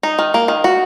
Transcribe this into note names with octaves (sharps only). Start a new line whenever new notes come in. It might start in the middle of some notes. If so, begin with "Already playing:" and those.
D#4
D#3
A#3
D#3
F#4